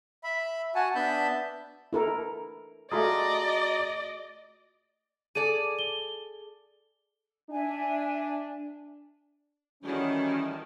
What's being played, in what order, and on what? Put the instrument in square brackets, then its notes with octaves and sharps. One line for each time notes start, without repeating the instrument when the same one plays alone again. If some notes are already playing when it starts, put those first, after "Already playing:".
[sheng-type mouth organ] E5 B5
F#4 F#5 G#5 A5
B3 D4 E5 A5 B5 G6
[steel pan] E4 A4 A#4
[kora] A3 F4 G#4 [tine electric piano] F#4 A#5 D#6 [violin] D5 D#5
[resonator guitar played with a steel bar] G#4 A4 D5 [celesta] D#7
[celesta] G7
[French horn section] D4 [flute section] E5 G#5
[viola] D#3 E4 [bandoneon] E3 G3 A3 [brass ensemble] C#4 [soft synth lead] F#4